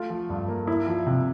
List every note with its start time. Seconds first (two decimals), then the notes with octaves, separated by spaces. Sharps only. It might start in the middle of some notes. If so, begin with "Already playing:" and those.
Already playing: A3 F4
0.10 F3
0.30 G2
0.48 A#3
0.67 E4
0.87 F3
1.06 C3